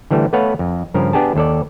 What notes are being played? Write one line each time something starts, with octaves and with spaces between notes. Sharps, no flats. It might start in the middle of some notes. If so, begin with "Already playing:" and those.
D3 E3 G3 A3
A3 B3 B4 C#5 F5 F#5
F2
G2 C#3 F3 A#4
B3 D4 G4 G#4 A5
D#2 A4 D5